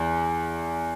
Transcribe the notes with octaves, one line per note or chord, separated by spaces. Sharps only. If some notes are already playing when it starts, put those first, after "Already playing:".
Already playing: E2